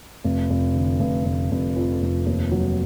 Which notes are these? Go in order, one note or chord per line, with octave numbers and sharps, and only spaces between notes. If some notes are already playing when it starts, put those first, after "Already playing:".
F1
F1
D3
F1
F1
F1
F2
F1
D#2
F#3